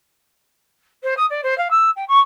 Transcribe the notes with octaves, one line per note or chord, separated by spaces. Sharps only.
C5
D#6
D5
C5
F5
E6
G5
C#6